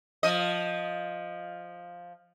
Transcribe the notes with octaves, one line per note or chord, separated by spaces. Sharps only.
F3 D#5